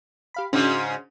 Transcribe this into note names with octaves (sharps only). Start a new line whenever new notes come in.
G4 F5 B5
G#2 C#3 C#4 D4 F#4